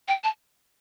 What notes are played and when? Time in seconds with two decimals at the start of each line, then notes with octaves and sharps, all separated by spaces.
0.08 G5
0.24 A5